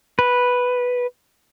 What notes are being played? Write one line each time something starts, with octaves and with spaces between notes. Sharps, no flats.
B4